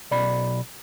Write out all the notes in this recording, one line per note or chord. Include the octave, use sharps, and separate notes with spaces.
B1 D5 B5